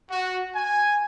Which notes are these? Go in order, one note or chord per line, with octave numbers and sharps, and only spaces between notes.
F#4
G#5